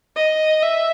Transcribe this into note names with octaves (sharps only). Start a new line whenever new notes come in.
D#5
E5